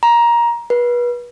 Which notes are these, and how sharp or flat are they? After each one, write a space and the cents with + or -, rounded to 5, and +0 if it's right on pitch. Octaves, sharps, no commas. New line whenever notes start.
A#5 +15
B4 -35